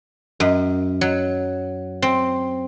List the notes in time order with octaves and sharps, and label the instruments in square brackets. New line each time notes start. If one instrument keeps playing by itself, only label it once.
[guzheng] F#2
F#3
C4